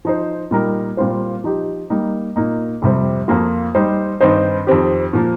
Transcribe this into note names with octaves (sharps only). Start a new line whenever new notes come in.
F3 D#4 C5
A#2 G3 D#4 A#4
A#2 G3 C4 F4 C5
F3 D#4 G4
G3 A#3 D#4
A#2 A#3 D#4
F2 C3 G3 C4
F2 F3 A#3 F4
G3 D#4 C5
G2 D#3 C4 D#4 C5
F2 D#3 C4 G4
A#2 F3 A#3